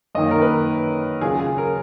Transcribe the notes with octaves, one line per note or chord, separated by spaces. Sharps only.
F#2 D#3 A#3 D#5
A#4
B4
C#3 F#3 C#4 F4 G#4
G#4
A#4